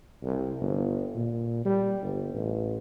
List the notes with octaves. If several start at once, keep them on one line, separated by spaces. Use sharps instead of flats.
C2
G1
A#2
G3
G1
A1